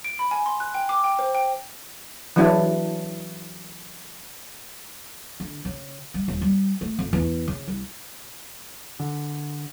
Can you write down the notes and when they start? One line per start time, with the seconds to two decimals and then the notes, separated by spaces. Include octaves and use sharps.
0.04 D7
0.19 B5
0.31 G#5
0.46 C6
0.60 F#6
0.74 G5
0.89 D6
1.04 G5
1.19 C5
1.35 G5
2.36 E3 F#3 G#3 D4 E4
5.40 D3
5.65 C#3
6.14 G3
6.28 D#1
6.41 G3
6.81 A3
6.99 F2
7.13 E2
7.48 C#3
7.68 C2
9.00 D3